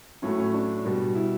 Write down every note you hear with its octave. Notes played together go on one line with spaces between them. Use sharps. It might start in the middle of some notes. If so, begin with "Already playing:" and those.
A2 F#3 A3 C#4
C#4
D4
B2 G3
E4